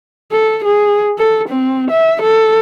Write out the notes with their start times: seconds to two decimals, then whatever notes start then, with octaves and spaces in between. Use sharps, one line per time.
0.32 A4
0.65 G#4
1.18 A4
1.49 C4
1.91 E5
2.22 A4